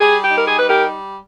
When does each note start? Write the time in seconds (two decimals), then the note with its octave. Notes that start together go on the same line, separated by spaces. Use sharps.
0.01 G3 G#4
0.24 G4
0.31 D#4
0.37 A#4
0.46 G#4
0.58 G3 B4
0.69 G4 A#4